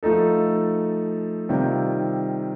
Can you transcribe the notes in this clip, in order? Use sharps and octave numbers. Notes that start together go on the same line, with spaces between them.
F3 A3 D#4 A4
C3 D#3 G3 C4 F4